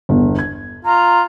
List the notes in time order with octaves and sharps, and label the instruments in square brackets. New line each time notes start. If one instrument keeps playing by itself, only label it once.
[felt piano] G1 E2
G#6
[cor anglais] F4 [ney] A#5